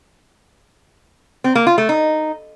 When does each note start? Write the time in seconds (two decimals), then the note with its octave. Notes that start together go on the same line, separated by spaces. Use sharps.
1.44 C4
1.55 A#3
1.67 F4
1.78 A3
1.89 D#4